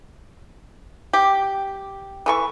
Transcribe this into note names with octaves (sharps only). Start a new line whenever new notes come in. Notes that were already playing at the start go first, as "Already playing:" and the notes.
G4
E3 A4 C#6